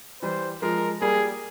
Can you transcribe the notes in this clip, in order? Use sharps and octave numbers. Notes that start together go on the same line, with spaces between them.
E3 G3 C5
F3 G#3 A#4
G3 A#3 G#4